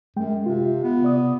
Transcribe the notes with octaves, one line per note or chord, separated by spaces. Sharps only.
F#2 G#3 G5
C3 F4
B3
C3 D5 D#6